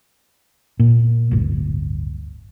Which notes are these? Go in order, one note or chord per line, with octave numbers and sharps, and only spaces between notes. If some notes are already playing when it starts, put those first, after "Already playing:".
A#2
D1 G1